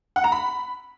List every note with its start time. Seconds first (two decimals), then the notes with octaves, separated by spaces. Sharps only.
0.16 F#5
0.24 A#5
0.32 B5